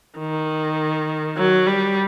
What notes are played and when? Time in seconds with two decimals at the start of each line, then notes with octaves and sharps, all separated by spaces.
0.19 D#3
1.37 F#3
1.67 G3